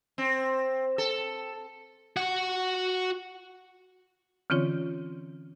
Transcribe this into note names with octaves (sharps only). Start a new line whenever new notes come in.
C4
A4
F#4 F#5
D3 E3 C4 C#4 F4 C#5